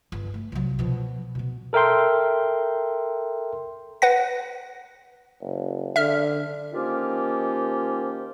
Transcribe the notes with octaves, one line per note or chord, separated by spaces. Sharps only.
G1
A3
C2 F#3
B2 F3
B2 B3
A4 A#4 E5 G5 C6
B4 F#5 A#6
F#1
D3 E5 F6
D#3 F3 A#3 C#4 F4 G4